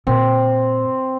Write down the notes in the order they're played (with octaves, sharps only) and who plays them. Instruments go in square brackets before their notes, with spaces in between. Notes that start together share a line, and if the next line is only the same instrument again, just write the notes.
[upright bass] A#2 [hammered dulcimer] C4